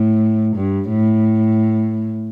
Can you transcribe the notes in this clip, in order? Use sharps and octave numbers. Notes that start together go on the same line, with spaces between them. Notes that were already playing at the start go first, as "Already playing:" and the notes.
Already playing: A2
G2
A2